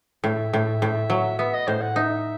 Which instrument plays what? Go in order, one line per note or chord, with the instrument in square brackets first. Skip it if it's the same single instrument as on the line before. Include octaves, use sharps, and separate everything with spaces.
[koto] A2 [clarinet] E5
[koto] A2
A2
F#3
[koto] B3 [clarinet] E5
[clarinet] D#5
[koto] A2 [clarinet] C5
[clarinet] F#5
[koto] D#4 [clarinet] E5